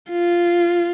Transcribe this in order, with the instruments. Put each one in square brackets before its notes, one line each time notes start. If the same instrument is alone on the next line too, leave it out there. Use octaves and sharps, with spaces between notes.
[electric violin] F4